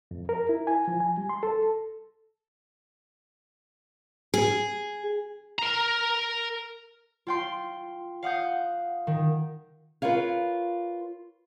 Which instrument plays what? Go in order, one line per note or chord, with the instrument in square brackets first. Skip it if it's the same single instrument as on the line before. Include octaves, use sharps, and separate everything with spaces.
[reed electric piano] F2
A#4
E4
G#5
F3
G#5
G3
C6
A4
[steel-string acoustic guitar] G#4
[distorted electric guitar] A#4 A#5
[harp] F4 G5 C6
F5 F#5 D#6 G6
D#3
[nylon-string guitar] F4 A#4 B4 C#5 F5